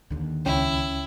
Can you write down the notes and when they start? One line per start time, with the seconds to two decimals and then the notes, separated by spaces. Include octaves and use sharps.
0.10 D#2 D3
0.46 C#2 C#4 E4 G5